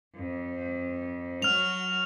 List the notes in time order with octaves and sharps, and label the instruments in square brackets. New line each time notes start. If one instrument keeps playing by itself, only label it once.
[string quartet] F2
[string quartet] F#3 F#4 C#5 [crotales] F6 F7